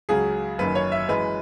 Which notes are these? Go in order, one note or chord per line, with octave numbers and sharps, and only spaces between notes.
C#2 C#3 F#3 G#4
F#1 F#2 D#3 B4
C#5
E5
F#2 E3 G#3 B4